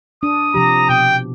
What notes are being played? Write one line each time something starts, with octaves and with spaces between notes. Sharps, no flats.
D4 D#6
C3 F3 G4 A#5
B2 G5